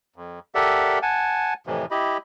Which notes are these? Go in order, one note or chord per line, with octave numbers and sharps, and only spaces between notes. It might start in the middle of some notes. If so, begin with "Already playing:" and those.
F2
G4 A4 A#4 D5 E5 F#5
F#5 G#5 A5
F2 A2 C3 E3
E4 G4 D#5 B5